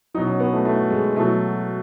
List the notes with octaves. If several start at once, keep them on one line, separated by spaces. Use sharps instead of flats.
B2 F#3 D#4
C#4
B3
A3
A3
G#3
B2 F#3 A3